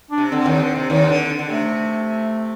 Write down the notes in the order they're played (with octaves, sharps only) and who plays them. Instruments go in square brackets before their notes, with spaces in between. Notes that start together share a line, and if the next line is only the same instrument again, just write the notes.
[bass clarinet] D4
[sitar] C3
[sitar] D3 [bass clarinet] C4
[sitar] D#2 D#3
D3
C3
D#2 D#3
D3
D3
[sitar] C3 [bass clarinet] A3